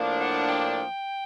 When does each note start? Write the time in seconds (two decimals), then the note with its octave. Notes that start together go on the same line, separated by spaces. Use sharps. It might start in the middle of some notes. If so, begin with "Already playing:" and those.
Already playing: A2 F3 A#3 D4
0.20 F#5
0.48 G5